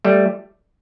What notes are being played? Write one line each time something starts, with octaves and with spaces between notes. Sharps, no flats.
G3 A3